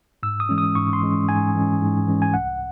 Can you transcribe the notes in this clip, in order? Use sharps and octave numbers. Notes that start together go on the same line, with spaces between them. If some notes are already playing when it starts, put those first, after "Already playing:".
G#2 E6
D#6
E3 G#3 C#4
D#6
G#2 C#6
C6
E3 G#3 C#4
G#2 G#5
E3 G#3 C#4
G#2
E3 G#3 C#4
G#5
C2 F#5